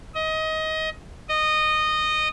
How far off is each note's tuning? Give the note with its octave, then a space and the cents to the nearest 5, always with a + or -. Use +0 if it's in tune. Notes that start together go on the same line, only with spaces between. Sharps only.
D#5 +20
D#5 -15